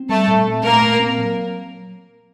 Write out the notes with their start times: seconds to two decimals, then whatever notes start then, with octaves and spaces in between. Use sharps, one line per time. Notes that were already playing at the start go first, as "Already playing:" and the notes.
Already playing: C4
0.09 G3 A3 A4
0.28 A#2
0.46 C4
0.63 A3 A#3 A#4
0.82 A#2
1.00 C4
1.18 F#3